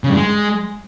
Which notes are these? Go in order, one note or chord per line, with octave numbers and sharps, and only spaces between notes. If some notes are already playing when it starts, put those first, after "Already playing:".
C#3
G2
G#3